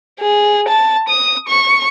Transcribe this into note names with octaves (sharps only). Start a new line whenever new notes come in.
G#4
A5
D#6
C#6